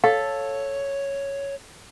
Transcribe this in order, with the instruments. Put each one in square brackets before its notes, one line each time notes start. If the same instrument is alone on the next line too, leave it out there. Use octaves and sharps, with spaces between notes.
[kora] A4 [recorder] C#5 [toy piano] F5